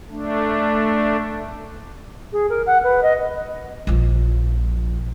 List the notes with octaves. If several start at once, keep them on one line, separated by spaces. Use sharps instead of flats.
A3 D4
G#4
A#4
F#5
B4
D#5
A#1 F3